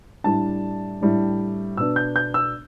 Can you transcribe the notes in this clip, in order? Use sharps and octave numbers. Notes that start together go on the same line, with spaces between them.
A2 G3 D4 A5
A2 G3 D4
B2 B3 D4 E6
G6
G6
E6